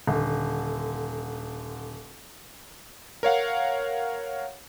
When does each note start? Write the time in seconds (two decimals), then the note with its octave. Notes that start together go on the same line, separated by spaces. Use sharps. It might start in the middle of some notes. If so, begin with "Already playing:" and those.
0.07 D#1 D3
3.23 A#4 C#5 F5 F#5